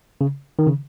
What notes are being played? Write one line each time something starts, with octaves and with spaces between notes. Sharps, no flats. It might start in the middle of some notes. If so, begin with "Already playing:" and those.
C#3
D#3
C#3